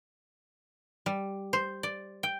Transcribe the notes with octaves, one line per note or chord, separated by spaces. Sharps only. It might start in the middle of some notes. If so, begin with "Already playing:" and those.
G3
C5
D5
G5